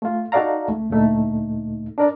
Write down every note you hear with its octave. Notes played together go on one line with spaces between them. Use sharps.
A3 F4
D#4 F#4 A4 D5 F5 A#5
C#2 A3
D2 A#2 A3 D#4
D4 A#4 D5